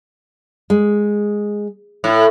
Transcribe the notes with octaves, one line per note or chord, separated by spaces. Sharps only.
G#3
A2